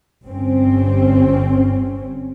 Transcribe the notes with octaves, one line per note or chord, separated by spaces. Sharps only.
G1 G2 C4 C#4